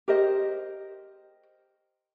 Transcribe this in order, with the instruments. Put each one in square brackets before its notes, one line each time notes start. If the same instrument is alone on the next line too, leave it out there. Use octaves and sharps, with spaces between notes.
[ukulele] G4 A#4 C5 D#5